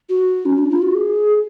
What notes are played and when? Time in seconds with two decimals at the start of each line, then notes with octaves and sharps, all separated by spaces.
0.09 F#4
0.45 C#4
0.58 D4
0.70 F4
0.82 F#4
0.95 G#4